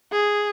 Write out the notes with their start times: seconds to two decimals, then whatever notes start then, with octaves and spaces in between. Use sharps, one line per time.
0.12 G#4